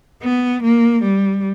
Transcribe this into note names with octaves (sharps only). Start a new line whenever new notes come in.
B3
A#3
G3